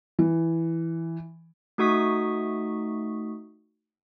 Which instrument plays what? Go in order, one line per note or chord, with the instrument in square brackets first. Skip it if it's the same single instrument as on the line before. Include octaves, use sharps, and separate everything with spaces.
[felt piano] E3
[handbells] A3 D#4 F#4 C#6 D#6 B6